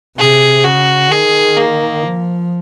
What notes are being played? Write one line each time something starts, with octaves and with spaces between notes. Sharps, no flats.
C3 G#4
C#3 F#4
D#3 G#4
A#3
F3